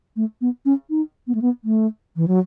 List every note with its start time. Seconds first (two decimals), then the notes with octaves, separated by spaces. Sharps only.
0.16 A3
0.41 B3
0.65 C#4
0.90 D#4
1.27 B3
1.35 A3
1.42 B3
1.64 A3
2.16 E3
2.28 F#3